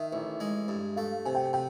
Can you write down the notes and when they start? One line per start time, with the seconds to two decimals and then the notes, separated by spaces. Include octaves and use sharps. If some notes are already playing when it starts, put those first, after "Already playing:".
Already playing: D#3 E5
0.13 A1
0.40 G#3
0.68 G2
0.96 A3 F5
1.25 C3 G#5
1.35 G5
1.53 C3 G5